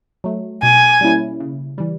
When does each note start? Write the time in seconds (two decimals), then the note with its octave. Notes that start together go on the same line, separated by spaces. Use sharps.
0.24 F#3 A3
0.63 B2 G#5
1.01 G3 A#3 C#4 E4
1.40 C#3
1.78 E3 G3